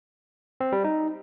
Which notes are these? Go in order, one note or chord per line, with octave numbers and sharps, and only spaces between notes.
C4
G3
D#4